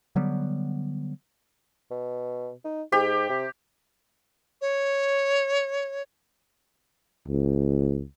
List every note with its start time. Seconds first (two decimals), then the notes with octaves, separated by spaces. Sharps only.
0.16 D3 F#3 G3 B3
1.91 B2
2.65 D#4
2.92 G#2 G4
3.30 C3
4.61 C#5
7.28 C#2